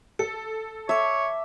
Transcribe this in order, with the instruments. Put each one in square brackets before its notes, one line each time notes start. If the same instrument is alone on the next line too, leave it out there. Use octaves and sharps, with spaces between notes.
[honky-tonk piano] A4 [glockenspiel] C#7
[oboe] C#5 [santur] E5 [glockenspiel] A5 D6